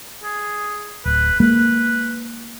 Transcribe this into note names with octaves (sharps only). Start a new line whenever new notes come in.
G#4
D1 B4
G#3 A#3 B4